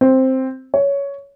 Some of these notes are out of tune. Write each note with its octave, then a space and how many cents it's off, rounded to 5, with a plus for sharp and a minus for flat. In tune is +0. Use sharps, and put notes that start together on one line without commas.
C4 +5
C#5 +15